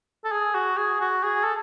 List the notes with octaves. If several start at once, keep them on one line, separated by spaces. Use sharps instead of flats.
A4
G#4
F#4
G#4
F#4
G#4
A4